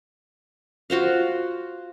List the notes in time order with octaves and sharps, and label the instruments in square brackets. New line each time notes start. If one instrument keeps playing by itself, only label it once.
[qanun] F4 F#4 C5 F5